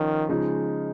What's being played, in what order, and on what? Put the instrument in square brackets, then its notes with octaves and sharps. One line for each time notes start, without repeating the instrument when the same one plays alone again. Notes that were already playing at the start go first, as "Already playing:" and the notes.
Already playing: [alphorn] D#3 [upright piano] F3 C#4 F4
[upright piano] C#3 F3 G#3 D#4